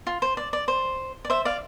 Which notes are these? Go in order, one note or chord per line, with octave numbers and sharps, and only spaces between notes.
F4
C5
D5
D5
C5
D5
C5 E5
D5 F5